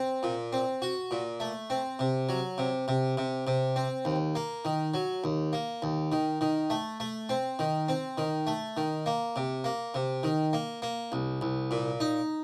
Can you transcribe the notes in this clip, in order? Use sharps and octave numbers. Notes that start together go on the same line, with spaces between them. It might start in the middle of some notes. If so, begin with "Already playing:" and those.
Already playing: C4
A#2
C4
F#4
A#2
A3
C4
C3
F#3
C3
C3
C3
C3
C4
D#2
A#3
D#3
F#3
D#2
A#3
D#2
D#3
D#3
A3
A3
C4
D#3
C4
D#3
A3
D#3
A#3
C3
A#3
C3
D#3
A#3
A#3
C2
C2
A#2
D#4